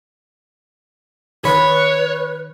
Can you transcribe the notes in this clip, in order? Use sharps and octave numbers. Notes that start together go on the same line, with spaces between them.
D#3 B4 C#5 B5